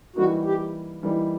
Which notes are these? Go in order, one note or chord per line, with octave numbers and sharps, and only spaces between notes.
E3 G3 A#3 D#4 F#4
G4
E3 G3 A#3 D#4